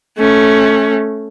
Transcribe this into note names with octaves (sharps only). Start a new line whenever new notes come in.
A3 C#4